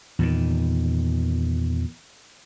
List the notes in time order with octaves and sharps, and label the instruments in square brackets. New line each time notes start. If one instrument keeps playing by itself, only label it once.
[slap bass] E2 A#2 D#3